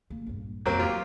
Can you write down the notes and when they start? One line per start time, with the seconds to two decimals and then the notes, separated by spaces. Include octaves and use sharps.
0.10 C#3 A#3
0.26 A#1 G2
0.66 F2 C#3 F#3 A#3 C4
0.79 A2 D3 F4 G4